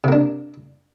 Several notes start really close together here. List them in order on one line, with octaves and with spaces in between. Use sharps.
C3 A#3 D4